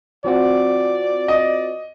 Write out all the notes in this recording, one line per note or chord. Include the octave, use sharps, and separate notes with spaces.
F3 C4 F#4 D5
D#5